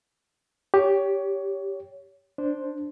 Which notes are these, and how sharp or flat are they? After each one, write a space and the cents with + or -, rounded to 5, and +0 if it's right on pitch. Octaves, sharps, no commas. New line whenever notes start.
G4 +0 C#5 +20
D4 +0 C5 +0